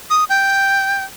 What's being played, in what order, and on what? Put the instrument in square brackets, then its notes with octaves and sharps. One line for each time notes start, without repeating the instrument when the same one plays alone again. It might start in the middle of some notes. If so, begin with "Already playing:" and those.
[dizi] D#6
G5